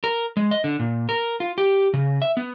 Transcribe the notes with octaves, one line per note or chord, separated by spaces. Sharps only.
A#4
G#3
D#5
D3
A#2
A#4
F4
G4
C#3
E5
B3